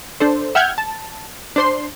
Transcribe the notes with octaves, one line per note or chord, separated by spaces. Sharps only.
D4 A4 C5
E5 F#5 G5 F6 G6 G#6
A5
D4 C5 C6